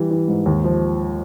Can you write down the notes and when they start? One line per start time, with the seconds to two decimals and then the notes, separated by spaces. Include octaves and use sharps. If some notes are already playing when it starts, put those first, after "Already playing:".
Already playing: E3 G3
0.11 E3
0.28 G#2
0.46 D#2
0.64 F3